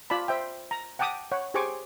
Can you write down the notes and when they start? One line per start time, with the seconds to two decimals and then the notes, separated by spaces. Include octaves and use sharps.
0.10 F4 D5 A5 B5
0.28 C5 E5 G5
0.71 A#5
0.99 F#5 G5 A5 D6 D#6
1.32 C#5 F#5
1.54 G4 G#4 C5 G#5 C#6 D6